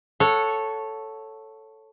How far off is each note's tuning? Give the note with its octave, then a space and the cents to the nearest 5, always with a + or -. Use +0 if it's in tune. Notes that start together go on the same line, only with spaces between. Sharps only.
A4 +0 C#5 -5 F#5 -25